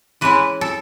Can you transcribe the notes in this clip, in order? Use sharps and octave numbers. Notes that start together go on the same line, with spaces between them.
E3 G#3 C#4 E4 B4
A4